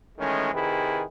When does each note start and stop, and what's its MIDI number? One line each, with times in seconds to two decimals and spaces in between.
0.18 0.53 51
0.18 0.53 52
0.18 0.53 56
0.18 0.53 57
0.18 0.53 61
0.54 1.03 48
0.54 1.03 51
0.54 1.03 64
0.54 1.03 68
0.54 1.03 71